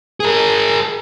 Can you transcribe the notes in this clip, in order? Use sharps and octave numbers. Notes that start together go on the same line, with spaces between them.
G#4 A#4